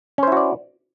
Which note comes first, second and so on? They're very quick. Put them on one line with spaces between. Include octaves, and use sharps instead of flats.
C#4 C5 E4 F#4 D5